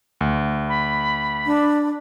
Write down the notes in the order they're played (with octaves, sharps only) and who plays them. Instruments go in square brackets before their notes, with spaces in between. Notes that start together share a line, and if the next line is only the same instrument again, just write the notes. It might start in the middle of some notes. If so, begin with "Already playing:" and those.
[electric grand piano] D2
[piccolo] B5
[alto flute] D4